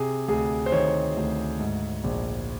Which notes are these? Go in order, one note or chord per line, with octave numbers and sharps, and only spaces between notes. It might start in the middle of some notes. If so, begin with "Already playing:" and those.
Already playing: C3 G#4
D2 G#4
C5
D#3 C#5
D2
G#2
A#1